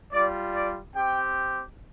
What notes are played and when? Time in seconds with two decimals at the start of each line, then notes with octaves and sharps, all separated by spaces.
0.12 G3 F4 D5
0.53 D5
0.95 C4 G4 G5